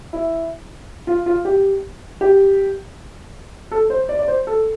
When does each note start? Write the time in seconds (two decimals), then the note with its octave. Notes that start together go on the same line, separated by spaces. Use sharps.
0.13 E4
1.07 F4
1.26 F4
1.45 G4
2.21 G4
3.71 A4
3.90 C5
4.09 D5
4.19 D5
4.28 C5
4.47 A4